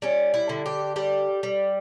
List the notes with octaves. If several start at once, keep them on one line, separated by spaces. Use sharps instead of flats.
G3 C#4
E4
D3
G4
G3 G4
G3